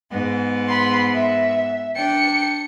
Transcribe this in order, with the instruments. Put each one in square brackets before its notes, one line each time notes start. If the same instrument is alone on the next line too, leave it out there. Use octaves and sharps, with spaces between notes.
[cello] G#2 B3
[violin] B5 C6
E5
[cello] D4 G5 [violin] C#7